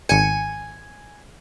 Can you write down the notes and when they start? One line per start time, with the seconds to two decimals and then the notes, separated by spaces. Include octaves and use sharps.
0.09 G#1 G#5 C#7